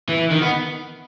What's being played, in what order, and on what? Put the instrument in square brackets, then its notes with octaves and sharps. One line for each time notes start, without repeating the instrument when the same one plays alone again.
[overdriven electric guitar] E3
D#3
B3